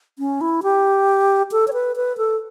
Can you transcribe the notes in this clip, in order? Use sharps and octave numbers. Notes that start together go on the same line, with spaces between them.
C#4
E4
G4
A4
C#5
B4
B4
A4